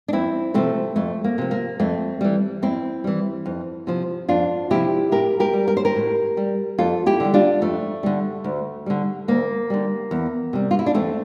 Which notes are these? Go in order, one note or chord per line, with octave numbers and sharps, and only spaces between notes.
D4
F2 C4 E4
C3 F3 A3 C4
F2 A3
A#3
C3 F3
A#3
F2 A3 C4
E3 G3
F2 C4 E4
E3 G3
F2
C3 F3
F2 D4 F4
C3 F3 E4 G4
A2 G4 A#4
G4 A#4
G3
A#4
C5
G4 A#4
A2
G3
F2 F4 A4
E4 G4
D3 G3
D4 F4
F2 A3
D3 G3
D2
D3 G3
D2 A#3
D3 G3
E2
C3 G3
F4
E4
D4
E2 A3 C4